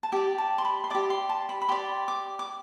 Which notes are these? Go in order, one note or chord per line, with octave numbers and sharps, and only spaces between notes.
A5
G4 D5 G5
A5
C6
B5
C6
G4 D5 D6
C6
A5
B5
B5
G4 D5 C6
D6
D6